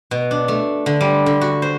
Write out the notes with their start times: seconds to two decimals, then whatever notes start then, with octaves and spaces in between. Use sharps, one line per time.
0.11 B2
0.31 D4
0.48 A3
0.86 D3
1.01 G3
1.26 D3
1.41 F#4
1.62 C5